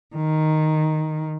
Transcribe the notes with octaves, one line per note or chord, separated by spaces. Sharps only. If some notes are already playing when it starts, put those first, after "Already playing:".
D#3